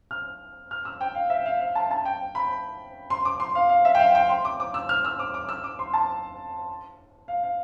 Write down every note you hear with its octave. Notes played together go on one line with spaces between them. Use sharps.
F6
F6
E6
G5
F5
E5
F5
F5
A5
A5
G5
B5
C6
D6
C6
F5
F5
E5
G5
F5
G5
C6
D6
D6
E6
F6
E6
D6
D6
E6
D6
C6
A5
F5
F5